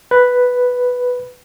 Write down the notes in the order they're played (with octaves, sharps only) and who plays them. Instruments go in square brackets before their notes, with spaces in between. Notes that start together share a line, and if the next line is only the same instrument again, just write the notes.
[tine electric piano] B4